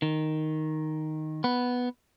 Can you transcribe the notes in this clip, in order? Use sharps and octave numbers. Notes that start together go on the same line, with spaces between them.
D#3
B3